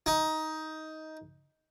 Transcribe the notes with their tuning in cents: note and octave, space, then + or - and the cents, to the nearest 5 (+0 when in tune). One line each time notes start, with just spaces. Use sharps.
D#4 +15